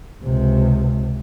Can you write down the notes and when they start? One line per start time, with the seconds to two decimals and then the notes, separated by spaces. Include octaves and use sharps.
0.23 C#2 C3